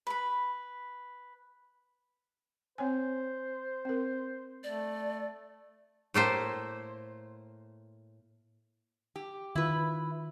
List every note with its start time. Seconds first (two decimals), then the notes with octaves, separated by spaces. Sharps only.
0.07 B4 B5
2.78 C4 C5 C#5 G#5
3.85 C4 A#4
4.64 A3 D5
6.14 A2 A3 A#3 C5
9.16 G4
9.55 D#3 E4 F4 B4